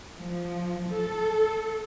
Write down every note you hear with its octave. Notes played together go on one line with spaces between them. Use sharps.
F3
A4